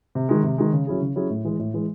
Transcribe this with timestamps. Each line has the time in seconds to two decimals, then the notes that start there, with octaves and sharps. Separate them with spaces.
0.15 C3
0.29 D#3 G#3
0.43 C3
0.58 D#3 G#3
0.73 C#3
0.87 F#3 C#4 E4 G#4
1.01 C#3
1.16 F#3 C#4 E4 G#4
1.30 A2
1.44 E3 G#3
1.59 A2
1.74 E3 G#3